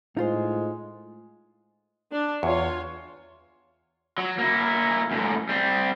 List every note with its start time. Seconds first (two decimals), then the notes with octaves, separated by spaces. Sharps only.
0.17 A2 G#3 D#4 F4 C5
2.13 D4
2.43 E2 F4 C#5
4.18 F#3
4.38 A#3 E4
5.11 F#2 A2
5.49 G3 C4